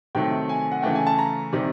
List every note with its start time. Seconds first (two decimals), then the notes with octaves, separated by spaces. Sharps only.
0.15 C3 D#3 F#3 A3 G5
0.49 G#5
0.72 F#5
0.82 C#3 E3 A3 G5
0.95 G#5
1.07 A5
1.19 A#5
1.53 C3 D#3 G3